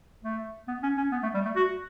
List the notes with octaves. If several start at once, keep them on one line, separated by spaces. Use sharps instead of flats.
A3
B3
C#4
C#4
B3
A3
G3
A3
F#4